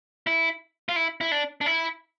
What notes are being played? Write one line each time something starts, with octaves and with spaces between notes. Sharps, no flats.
E4
F4
E4
E4
D4
D4
E4